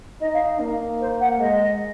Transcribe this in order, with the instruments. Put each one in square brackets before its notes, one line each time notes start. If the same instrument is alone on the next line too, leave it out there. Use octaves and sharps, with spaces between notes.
[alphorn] D#4 [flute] D#5
[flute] F5
[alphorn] A#3
[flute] C5
F#5
[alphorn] G#3 [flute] D#5